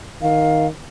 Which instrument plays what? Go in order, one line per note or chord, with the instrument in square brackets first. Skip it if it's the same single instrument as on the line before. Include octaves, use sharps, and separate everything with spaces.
[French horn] D#3 [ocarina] F5